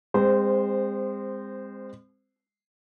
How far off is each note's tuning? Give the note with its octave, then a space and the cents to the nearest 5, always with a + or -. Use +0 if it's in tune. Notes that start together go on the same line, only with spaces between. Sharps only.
G#3 -35 C4 +0 C5 -15